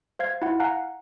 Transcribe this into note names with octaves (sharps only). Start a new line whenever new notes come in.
C5 F5 G#6
E4 F4 F#5
F5 F#5 G#5 A#5 F#6